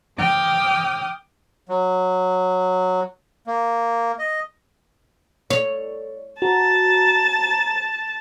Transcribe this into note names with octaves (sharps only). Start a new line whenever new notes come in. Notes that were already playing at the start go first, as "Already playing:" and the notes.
G5 D6 D#6 F6
F#3
A#3
D#5
A4 C#5 D5
F#4 C5 A5 A#5